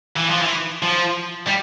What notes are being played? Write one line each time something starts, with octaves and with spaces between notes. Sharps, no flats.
E3
F3
E3
F3
G3